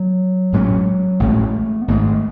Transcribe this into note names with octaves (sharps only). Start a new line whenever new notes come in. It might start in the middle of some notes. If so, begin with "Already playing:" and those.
Already playing: F#3
A1 A2 G#3 C#4
A1 A2 G#3 A3 C#4
B3
G#1 G#2 G#3 A3